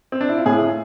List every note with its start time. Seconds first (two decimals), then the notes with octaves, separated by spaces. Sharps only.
0.12 C4
0.21 D4
0.29 E4
0.38 F4
0.46 A2 G#4